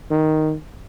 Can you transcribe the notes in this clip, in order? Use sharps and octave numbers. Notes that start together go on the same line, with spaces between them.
D#3